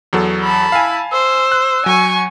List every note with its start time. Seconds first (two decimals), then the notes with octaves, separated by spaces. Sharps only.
0.13 E2 F#3 A4
0.43 A5 B5
0.72 E4 F5 G#5
1.12 C5 E6
1.52 F#6
1.86 F#3 G#5 C#6